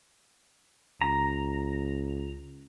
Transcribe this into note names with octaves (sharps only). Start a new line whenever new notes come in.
C#2 A#5